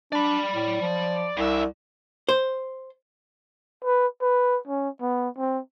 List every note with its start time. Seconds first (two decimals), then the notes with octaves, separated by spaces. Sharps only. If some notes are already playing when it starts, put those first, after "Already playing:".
0.12 D4 D5 B5
0.54 A2
0.81 F3
1.37 C2 G2 E5
2.29 C5
3.84 B4
4.21 B4
4.67 C#4
5.01 B3
5.37 C4